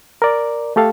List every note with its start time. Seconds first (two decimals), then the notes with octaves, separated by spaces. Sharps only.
0.22 A#4 D5
0.76 A3 G4 A4 F5